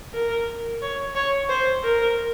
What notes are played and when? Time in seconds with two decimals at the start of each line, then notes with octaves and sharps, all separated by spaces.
0.13 A#4
0.82 C#5
1.15 C#5
1.49 C5
1.84 A#4